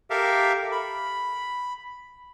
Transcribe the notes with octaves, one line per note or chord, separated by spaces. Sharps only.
G4 A4 A#4 E5 F5
B5